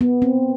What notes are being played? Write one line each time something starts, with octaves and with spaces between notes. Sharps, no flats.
B3
C4